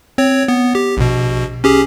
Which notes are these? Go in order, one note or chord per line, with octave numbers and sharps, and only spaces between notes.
C4 C#5
B3
G4
A#1 B2
C#4 G4 G#4